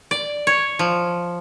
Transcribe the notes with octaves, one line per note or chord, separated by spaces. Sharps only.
D5
C#5
F3